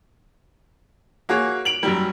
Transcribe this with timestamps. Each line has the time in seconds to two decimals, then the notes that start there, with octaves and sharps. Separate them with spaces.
1.29 A#3 F#4 G#4 C#5
1.65 D7 F7 F#7
1.83 F#2 F#3 G3